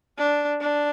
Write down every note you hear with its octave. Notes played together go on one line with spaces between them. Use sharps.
D4
D4